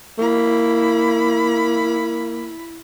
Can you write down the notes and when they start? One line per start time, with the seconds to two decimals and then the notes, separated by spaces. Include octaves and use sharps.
0.18 A#3 E4 B5